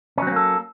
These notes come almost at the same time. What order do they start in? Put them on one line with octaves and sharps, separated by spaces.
C#4 F#3 C4 A#3 A4